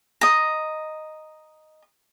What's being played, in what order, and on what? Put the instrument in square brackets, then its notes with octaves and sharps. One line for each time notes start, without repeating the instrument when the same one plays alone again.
[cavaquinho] D#5 A#5